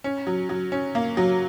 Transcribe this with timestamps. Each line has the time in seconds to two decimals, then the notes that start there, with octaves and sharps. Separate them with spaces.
0.04 C#4
0.27 F#3
0.49 F#3
0.72 C#4
0.95 A#3
1.17 F#3